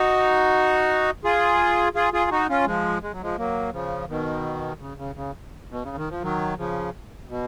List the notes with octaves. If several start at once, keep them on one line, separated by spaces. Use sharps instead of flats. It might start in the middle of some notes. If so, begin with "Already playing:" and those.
Already playing: D#4 F#4
F4 G#4
F4 G#4
F4 G#4
D#4 F#4
C#4 F4
F3 G#3
G#3
F#3
F3 G#3
F#3 A#3
C#3 F3
B2 D#3
C#3
C#3
C#3
B2
C#3
D#3
F3
D#3 F#3
C#3 F3
B2